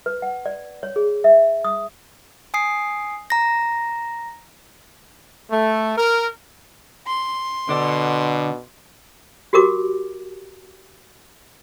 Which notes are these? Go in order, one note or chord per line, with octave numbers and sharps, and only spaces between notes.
B4
F#5
D5
C#5
G#4
E5
D#6
G#5 D#6 C7
A#5 A#6
A3
A#4
C6
B2 D3 D4
F#4 G4 A#4 D6